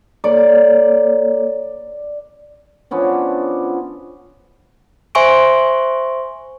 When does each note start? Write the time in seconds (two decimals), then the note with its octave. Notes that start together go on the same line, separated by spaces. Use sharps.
0.24 A#3 A4 C#5 D5
2.91 F3 B3 C#4 D4
5.15 C5 E5 G#5 C6 C#6 D7